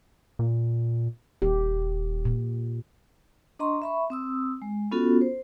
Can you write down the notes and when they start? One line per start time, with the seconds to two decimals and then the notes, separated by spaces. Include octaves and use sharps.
0.39 A#2
1.42 D#1 G4
2.25 A#2
3.59 D4 D#5 A#5 C6 C#6
3.82 E5 B5 C#6
4.10 C4 D#6 E6
4.62 G#3
4.92 B3 C#4 F4 F#4 A4
5.21 C5